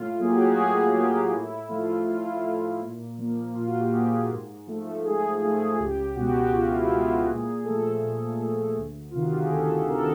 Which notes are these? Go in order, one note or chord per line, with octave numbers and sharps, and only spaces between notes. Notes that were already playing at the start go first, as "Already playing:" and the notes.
Already playing: A2 F4
F#3 A#3 G#4
G4
F#4
G4
A2 G#4
F#3 A#3 G4
A2 E4
F3 A3 F4
A2 F4
E4
F4
F3 A3
A#2
F3 A#3
A#2 F4
F#4
G4
F3 A#3 G#4
G#2
F3 A3
G#2 G#4
F3 A3 G#4
G#4
C#2 G4
B2 G#3 F#4
G4
F#4
C#2 F4
E4
E4
B2 G#3 F4
F#4
A#2 G#4
F3 A3 A4
A#2
F3 A3
D2
C3 D#3 F4
F#4
G4
G#4
D2 A4
C3 D#3 A#4
A4